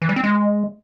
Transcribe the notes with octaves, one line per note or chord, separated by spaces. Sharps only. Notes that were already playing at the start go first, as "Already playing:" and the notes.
E3
G3
C4
G#3